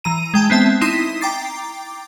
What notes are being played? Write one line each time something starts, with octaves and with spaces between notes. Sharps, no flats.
E3 A#5 D#7
G#3 G5 A5
B3 C4 E5 A5
D#4 E4 C6 D#6 B6 C7
G5 A#5 D6 A6 C7